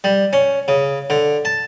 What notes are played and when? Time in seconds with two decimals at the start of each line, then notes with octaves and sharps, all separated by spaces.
0.04 G3
0.33 C#4
0.68 C#3
1.10 D3
1.45 A5